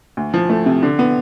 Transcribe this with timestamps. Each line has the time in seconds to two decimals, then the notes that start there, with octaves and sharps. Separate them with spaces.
0.17 D2
0.34 F3
0.49 A3
0.66 C3
0.83 D3
0.99 B3